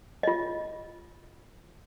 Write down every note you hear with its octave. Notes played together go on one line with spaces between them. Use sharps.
F4 D#5